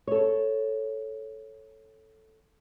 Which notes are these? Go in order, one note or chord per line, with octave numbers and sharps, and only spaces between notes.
A4 C#5